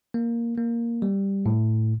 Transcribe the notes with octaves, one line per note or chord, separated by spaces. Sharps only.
A#3
A#3
G3
A2